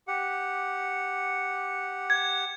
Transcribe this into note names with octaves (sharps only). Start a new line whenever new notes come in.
G4 F#5
G#6